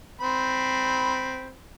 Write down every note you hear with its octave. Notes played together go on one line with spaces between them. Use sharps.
C4 B5